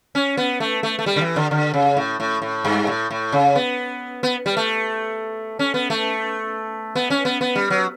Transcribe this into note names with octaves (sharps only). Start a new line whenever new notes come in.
C#4
B3
A3
A3
A3
G3
D3
E3
D3
D3
C#3
A2
A2
A2
G2
A2
A2
C#3
B3
B3
G3
A3
C#4
B3
A3
B3
C#4
B3
B3
G3
F#3